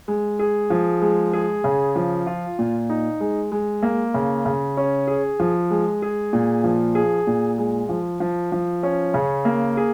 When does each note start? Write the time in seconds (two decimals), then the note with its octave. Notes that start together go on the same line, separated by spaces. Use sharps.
0.08 G#3
0.39 G#4
0.70 F3
1.02 G#3
1.33 G#4
1.64 C#3
1.96 F3
2.26 F4
2.59 A#2
2.89 D#4
3.20 G#3
3.52 G#3
3.83 A#3
4.14 C#3
4.45 C#3
4.77 C#4
5.07 G#4
5.40 F3
5.71 G#3
6.02 G#4
6.33 A#2
6.64 F3
6.95 G#4
7.27 A#2
7.58 G#3
7.89 F3
8.20 F3
8.52 F3
8.83 C#4
9.14 C#3
9.45 A#3
9.77 G#4